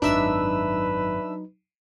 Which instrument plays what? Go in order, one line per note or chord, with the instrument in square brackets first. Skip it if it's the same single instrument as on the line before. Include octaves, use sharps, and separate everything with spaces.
[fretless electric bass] G#1 F#2 [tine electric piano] F#3 D#4 [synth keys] D4 E5 E6 [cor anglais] B4